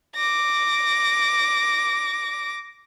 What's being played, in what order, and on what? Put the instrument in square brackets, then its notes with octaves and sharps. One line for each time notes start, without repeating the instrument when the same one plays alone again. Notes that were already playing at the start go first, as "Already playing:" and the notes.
[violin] D6 A#6